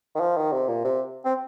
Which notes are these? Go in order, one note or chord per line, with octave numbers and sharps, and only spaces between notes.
D#3
F3
D#3
C3
A#2
C3
C4